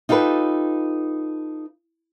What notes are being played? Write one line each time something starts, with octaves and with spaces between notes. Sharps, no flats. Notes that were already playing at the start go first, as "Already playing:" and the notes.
D#4 F4 G4 A4 B4